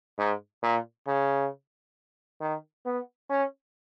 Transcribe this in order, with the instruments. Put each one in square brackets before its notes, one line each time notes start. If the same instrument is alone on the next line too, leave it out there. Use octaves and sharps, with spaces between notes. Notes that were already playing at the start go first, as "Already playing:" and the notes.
[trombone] G#2
A#2
C#3
D#3
B3
C#4